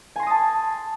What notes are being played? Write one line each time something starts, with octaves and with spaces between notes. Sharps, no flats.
G#5 A5 C6 D#6 A#6